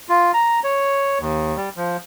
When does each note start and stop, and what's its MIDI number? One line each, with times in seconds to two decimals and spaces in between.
0.09 0.32 65
0.34 0.60 82
0.64 1.19 73
1.20 1.56 39
1.56 1.69 55
1.77 1.97 53